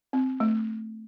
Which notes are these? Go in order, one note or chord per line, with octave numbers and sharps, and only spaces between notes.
C4
A3